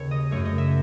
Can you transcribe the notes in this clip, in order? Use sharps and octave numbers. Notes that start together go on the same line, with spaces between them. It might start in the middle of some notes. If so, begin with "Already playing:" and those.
Already playing: D#2 C#3 C#5
D#5
F#2 C#3 F#3 A3 C#5
D#5
E5